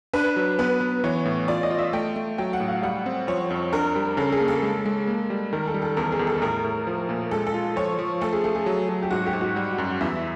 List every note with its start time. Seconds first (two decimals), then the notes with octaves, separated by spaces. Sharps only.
0.13 D4 B4
0.36 F#3
0.59 B3 B4
0.81 B3
1.04 E3 C#5
1.25 A2
1.48 F4 D5
1.63 D#5
1.71 F4
1.79 E5
1.93 A3 G5
2.16 A3
2.38 F#3 G5
2.53 F#5
2.60 A2
2.68 F5
2.82 G3 F#5
3.06 C4
3.28 F3 C#5
3.50 F2
3.73 D4 A#4
3.96 G3
4.17 C#3 A4
4.32 G#4
4.40 A#3
4.48 A4
4.62 G#3
4.86 G#3
5.07 A#3
5.30 G3
5.53 D#3 A#4
5.67 A4
5.74 G3
5.82 A4
5.97 E2 A#4
6.12 G#4
6.19 E2
6.27 A4
6.42 A2 A#4
6.64 A2
6.87 F3
7.09 A#2
7.31 G#3 A4
7.47 A4
7.54 F4
7.76 F3 C#5
7.99 F3
8.21 A3 A4
8.33 G#4
8.44 A3 A4
8.55 G#4
8.66 F#3
8.89 F#3
9.02 G4
9.11 G#2 F#4
9.26 G4
9.33 G#2
9.41 F#4
9.56 G3
9.78 F#2
10.01 E2 E4